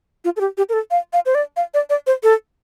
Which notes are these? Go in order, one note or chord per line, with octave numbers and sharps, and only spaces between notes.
F4
A4
G4
G4
A#4
A4
F5
F5
C5
D5
F5
D5
D5
C5
A4